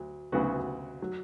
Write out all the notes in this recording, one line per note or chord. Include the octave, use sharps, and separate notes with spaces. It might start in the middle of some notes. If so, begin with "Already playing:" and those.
Already playing: D2 F#3
D2 C#3 F#3 B3 F#4
F#3